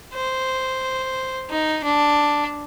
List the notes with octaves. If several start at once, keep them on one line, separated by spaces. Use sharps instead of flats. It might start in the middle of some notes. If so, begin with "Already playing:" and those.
C5
D#4
D4